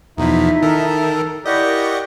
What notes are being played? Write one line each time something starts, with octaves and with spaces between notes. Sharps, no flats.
E2 B2 F3 D#4 E4 E5
D#3 A4 A#4
E4 G4 A#4 D5 D#5 F#5 C#6